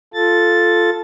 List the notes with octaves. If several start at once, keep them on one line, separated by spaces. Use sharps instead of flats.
F4 A4 A6